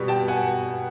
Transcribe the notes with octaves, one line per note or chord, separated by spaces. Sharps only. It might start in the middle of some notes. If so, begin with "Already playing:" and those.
Already playing: B2 G3
G5 A5
F#5 G#5